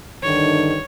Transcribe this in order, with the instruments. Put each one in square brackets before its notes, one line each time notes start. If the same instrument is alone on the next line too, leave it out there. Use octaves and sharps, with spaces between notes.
[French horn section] G2 D3 D#3 [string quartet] C#5